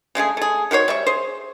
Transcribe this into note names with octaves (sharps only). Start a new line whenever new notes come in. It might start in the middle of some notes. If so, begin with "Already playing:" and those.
C#3 G#3 A3 G#4
A3 G#4
D#3 F#4 C5 C#5
G3 E5 C#6
G#4 C5